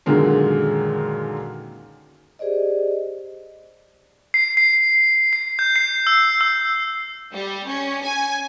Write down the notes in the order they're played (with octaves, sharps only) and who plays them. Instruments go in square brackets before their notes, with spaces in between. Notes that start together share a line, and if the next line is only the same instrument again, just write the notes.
[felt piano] F#2 A#2 D3 D#3 G#3 A#4
[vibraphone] G4 G#4 C5 D5 D#5
[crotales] C7
C7
C7
G6
C7
E6
E6
[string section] G3
C#4
G#5